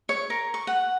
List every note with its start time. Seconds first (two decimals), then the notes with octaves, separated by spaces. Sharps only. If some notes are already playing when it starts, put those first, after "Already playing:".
0.09 C#5
0.30 A#4
0.54 C#6
0.67 F#5